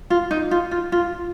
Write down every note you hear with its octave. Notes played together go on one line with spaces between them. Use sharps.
F4
D#4
F4
F4
F4